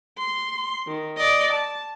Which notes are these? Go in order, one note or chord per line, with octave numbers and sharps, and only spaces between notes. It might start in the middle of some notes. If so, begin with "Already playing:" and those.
C6
D#3
D5 D#5
A5